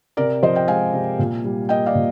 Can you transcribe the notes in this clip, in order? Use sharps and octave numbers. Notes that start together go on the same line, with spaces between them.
C3 A#4 D5
F3 C5 D#5
D#5 G5
G#3 F5 G#5
C3
A#2
G3
A#3 D#5 G5
D5 F5
A#2